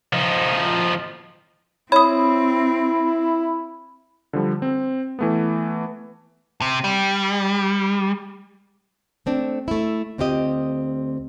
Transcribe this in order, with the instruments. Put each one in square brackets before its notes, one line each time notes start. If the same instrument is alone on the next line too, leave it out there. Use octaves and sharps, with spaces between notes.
[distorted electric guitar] F3 D#4
[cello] C4 [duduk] E4 [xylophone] C#5 D#6 [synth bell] B5
[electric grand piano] D3 F3 G3
C4
E3 A3 B3
[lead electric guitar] C3
G3
[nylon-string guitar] A3 C4 D4
A3 E4
D2 C4 F4 G4 D#5